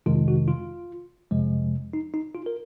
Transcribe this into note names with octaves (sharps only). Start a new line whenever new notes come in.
F2 C3 D#3 G#3 F4
F#4
F4
F2 C3 F3 G#3
D#4
D#4
F4
A#4